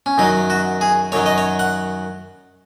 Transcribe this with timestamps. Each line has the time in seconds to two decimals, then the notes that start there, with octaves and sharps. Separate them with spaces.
0.06 C#4
0.18 F#2 D#3 F#3 D#4
0.50 F#4
0.81 G#4
1.12 F#2 D#3 F#3 C#5
1.26 D#5
1.38 C#5
1.59 F#5